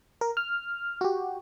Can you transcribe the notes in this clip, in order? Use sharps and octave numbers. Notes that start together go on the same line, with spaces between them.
A#4
F6
F#4 G4